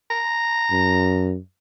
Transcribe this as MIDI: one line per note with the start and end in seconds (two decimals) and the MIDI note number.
0.11 1.30 82
0.72 1.38 42